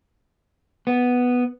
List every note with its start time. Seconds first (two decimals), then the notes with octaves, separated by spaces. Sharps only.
0.87 B3